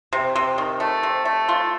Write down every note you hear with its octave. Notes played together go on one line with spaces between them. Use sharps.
C3
C3
D#3
A3
C3
A3
F4